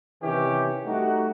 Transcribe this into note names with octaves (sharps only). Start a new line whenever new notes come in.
C3 D#3 E3 C#4 G4
G3 A3 D#4 F#4